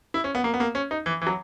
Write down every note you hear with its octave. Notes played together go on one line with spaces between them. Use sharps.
E4
C#4
B3
A#3
B3
A#3
C#4
D#4
E3
E3
F#3